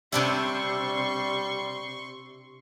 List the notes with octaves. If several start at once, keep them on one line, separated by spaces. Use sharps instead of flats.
C3 G3 D4 E4 C6 C#6